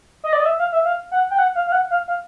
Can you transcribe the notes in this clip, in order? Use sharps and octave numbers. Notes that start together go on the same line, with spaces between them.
D#5
D5
D#5
E5
F5
E5
F5
F#5
G5
F#5
F5
F5
F#5
F5
F5